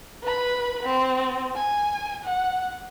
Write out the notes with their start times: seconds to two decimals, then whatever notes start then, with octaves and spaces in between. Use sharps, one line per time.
0.23 B4 B5
0.83 C4
1.55 G#5
2.23 F#5